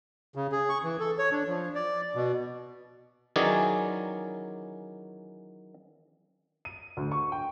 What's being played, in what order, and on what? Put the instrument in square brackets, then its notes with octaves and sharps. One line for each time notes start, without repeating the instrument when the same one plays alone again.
[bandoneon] C#3
G#4
C#6
E3
A4
C#5
D4
F3
D5
B2
[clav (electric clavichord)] D#3 E3 F#3 C#4 G#4 D5
[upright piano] D#7
D2
C#6
G5